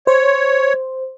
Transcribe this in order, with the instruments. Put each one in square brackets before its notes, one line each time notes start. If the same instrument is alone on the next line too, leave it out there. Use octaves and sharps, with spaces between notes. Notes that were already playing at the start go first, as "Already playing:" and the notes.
[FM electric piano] C5 [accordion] C#5